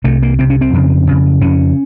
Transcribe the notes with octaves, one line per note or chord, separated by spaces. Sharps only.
C2 C3 A3
A#3
C2 C3 C4
C#4
C4
F2 C#3
F2 C#3
F2 C#3 C#4